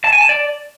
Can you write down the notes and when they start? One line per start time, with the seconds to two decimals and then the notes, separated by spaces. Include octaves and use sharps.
0.04 A5
0.13 G#5
0.21 A5
0.29 D5